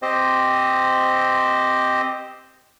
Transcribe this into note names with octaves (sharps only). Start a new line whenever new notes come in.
C4 G4 C5 D#5